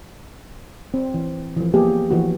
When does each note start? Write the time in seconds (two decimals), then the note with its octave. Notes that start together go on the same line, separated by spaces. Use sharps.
0.94 C4
1.14 E3
1.56 E3 F3
1.74 A#3 B3 G4 G#4
2.10 E3 F3 F#4